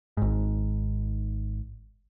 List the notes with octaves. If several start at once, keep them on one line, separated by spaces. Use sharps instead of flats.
G#1 G#2